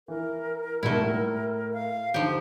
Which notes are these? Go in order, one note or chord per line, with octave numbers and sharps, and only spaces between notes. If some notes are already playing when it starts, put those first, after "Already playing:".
E3 A#4
G#2 B2 G3 A3 E4
A2
F5
D3 F3 D#4 G4 C5